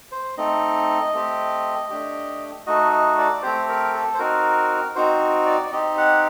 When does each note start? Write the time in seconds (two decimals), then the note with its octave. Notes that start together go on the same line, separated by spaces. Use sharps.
0.12 C5
0.38 A3 C4 D#4 D#5
1.14 A3 C4 G4
1.90 A3 D4 G4
2.67 A3 D#4 F#4 D#5
2.92 D#5
3.18 D5
3.43 A3 C4 G4 C5
3.69 A#4
3.94 A4
4.14 C5
4.19 C4 D#4 F#4 A#4
4.95 C4 D#4 F#4 C5
5.46 D5
5.67 D5
5.72 C4 D#4 G4 D#5
5.97 F#5